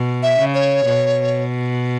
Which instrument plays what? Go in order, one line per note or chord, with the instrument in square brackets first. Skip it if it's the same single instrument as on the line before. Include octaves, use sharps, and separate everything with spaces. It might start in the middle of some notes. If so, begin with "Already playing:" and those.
Already playing: [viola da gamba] B2
[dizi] E5
[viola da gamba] C#3
[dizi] C#5
[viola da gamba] B2